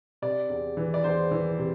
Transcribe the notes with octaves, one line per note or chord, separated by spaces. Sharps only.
C3 D5
E2
E3
D5
E2 C5
E3
C3